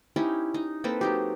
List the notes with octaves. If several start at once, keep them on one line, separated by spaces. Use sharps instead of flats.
C#4 D#4 E4 G4
D#4
A#3 C4 A4 B4
F#3 D#4 G4